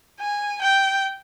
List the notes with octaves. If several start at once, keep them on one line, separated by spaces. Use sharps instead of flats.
G#5
G5